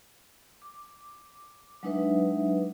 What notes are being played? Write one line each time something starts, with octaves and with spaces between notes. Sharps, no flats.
D6
F#3 G#3 D4 D#4 B4 E5